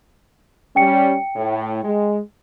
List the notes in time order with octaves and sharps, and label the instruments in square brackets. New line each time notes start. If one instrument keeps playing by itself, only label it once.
[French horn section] G3 C#4 [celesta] G5 C#7
[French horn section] A2
G#3